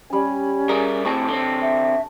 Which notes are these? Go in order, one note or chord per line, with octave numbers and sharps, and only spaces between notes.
G3 C#4 G#5
G3 G#4 A#4
A2 C4 G#5 A5 C#6
D3 C4
E5